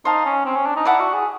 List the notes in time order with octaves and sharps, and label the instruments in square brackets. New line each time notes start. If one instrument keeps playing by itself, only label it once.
[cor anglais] D#4 [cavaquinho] C5 F5 A5
[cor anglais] C#4
C4
C#4
D4
D#4
[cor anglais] E4 [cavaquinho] D5 F#5 A5 D6
[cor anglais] F#4
G#4